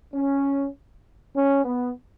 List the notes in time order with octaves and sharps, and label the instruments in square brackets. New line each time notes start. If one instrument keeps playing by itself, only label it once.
[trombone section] C#4
C#4
B3